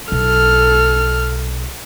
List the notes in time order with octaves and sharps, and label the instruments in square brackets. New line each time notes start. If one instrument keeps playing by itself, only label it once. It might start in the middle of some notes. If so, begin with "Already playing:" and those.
[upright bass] B1 [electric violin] A4 F6